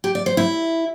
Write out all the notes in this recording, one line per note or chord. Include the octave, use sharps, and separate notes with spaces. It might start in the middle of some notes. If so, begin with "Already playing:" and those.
G4
D5
C5
E4